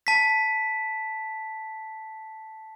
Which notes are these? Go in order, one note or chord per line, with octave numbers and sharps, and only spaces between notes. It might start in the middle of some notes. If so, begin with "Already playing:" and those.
A5 B6